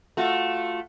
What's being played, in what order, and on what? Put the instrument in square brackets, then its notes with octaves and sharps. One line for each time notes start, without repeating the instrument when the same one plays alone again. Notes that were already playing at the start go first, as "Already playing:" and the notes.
[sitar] A3 F4 F#4